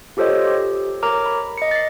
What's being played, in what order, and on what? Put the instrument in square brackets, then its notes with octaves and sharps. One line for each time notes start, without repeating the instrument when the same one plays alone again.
[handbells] F4 G4 A4 C5 C#5 D#5
G4
A#4 C#5 A#5 D6 F6
B5
D#5 C#7
A6 C7